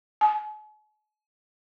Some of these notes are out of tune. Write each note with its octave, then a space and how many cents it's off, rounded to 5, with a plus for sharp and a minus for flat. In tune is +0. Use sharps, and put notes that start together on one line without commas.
G#5 +45